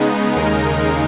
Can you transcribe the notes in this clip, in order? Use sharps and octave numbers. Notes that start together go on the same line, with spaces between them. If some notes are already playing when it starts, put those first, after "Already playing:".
Already playing: C#3 G#3 B3 D#4
D#2 C#3 G#3 D#4 A#4